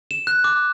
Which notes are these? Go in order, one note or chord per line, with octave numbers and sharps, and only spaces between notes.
E7
F#6
D6